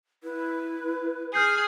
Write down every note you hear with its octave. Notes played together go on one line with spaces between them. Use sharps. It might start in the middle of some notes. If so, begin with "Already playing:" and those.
E4 B4
G#4 F6 G6 C7